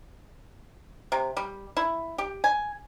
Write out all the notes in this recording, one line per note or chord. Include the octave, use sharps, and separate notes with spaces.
C3
G3
E4
G4
G#5